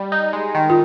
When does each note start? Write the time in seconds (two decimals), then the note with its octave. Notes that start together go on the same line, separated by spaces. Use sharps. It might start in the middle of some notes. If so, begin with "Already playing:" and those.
Already playing: G3
0.12 D#4
0.33 G#3
0.55 D#3
0.70 F4